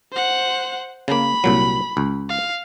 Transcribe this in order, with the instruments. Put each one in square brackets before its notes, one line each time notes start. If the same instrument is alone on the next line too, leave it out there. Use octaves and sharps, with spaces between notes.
[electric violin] C5 F#5
[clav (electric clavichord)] C#3 A#3 [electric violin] B5
[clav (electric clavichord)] C2 A#2 F#3
C#2
[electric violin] F5